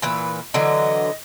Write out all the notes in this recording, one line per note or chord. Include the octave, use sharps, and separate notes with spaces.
A#2 E3 B4
D3 E3 F#3 D#5